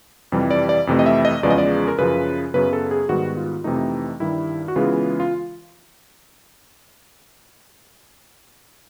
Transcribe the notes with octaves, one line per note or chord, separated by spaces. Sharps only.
F2 C3 E3 G3
D5
D5
F2 C3 E3 A3
D#5
E5
D#5
E2 C#3 F3 G#3 B3 D5
D#5
D5
A#4
F#2 C#3 F3 B4
F#2 C#3 F#3 B3 B4
A4
G#4
G#2 D#3 G3 B3 F#4
F4
F2 C3 E3 A3 D#4
G2 D#3 G3 E4
F#4
C#3 E3 G#3 B3 F4
F4